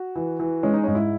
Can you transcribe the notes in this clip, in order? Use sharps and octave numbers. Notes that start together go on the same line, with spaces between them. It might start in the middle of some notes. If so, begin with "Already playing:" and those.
Already playing: F#4
E3
E3
G#3 C#4
D#4
G#2 C#4
E4